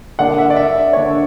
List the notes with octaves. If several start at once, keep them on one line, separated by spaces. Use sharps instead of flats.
D3 A#3 D4 F#5
E5
D5
E5
D3 A#3 D4 C#5